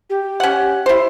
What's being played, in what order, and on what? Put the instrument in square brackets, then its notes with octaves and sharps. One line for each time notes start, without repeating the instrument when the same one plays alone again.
[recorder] G4
[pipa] C#4 F#5
E4 C5